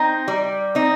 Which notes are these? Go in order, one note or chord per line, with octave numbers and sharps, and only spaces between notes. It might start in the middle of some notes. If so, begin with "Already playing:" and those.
Already playing: C4 D#4
G3
C4 D#4